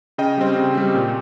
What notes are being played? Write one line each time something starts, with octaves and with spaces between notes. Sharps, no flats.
C#3 D#5 G5
G3 C4
C#3
G3 C4
A#2